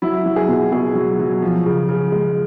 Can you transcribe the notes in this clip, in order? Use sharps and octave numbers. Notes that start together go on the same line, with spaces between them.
F#3 E4
F#3
G#4
B2
B2 G#4
F#3
F#3
F3
C#3
C#3
G#3